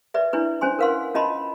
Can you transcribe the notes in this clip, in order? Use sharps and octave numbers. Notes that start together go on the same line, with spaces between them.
B4 D5 E5
D4 E4 B4
C#4 C5 G#5 C6
A#4 B4 F5 F#5 C6
C#4 F4 D#5 A5 B5 C6